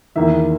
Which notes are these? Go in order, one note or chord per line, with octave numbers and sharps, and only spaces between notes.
E2 D#3 A#3 E5